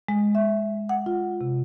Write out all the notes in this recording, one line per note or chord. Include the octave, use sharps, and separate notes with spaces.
G#3
E5
F#5
F4
C3